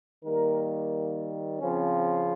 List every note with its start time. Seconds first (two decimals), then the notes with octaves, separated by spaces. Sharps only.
0.25 D#3 G3 A#3 A#4
1.60 C#3 F3 C4 C#4